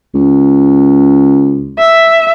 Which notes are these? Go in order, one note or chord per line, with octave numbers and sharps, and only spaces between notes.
C#2
E5